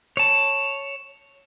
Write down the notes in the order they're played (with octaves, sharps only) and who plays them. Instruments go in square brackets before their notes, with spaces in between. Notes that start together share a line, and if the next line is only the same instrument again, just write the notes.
[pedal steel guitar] C#5 A5